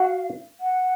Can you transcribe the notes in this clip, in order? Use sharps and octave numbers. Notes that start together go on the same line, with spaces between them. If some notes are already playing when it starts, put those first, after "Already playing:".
Already playing: F#4 F5
F#5